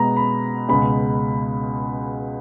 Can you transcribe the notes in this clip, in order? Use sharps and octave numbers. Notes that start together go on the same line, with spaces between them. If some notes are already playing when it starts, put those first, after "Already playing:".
Already playing: B2 G#3 B3 A#5
B5
C#2 B2 G#3 B5